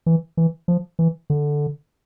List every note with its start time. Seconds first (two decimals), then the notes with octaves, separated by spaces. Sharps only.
0.06 E3
0.37 E3
0.68 F3
0.99 E3
1.30 D3